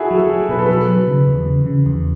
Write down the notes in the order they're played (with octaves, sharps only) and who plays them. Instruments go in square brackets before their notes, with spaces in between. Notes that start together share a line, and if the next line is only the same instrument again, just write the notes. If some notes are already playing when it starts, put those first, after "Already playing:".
Already playing: [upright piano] E4 F#4 G#4 A4
[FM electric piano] F#3
[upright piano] A4
[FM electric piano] F#3
[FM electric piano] B2 [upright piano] B4
[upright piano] A4
[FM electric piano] F#3 [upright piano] B4
[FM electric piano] F#3
C#3
E2
C#3
C#3
E2